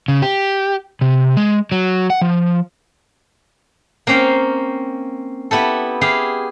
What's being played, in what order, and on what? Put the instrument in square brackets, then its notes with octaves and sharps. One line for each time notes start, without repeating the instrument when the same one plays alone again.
[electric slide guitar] C#3
G4
C3
G#3
F#3
F#5
F3
[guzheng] A#3 C4 C#4 F5 G5
B3 E4 G4 A4
E4 G4 G#4 F5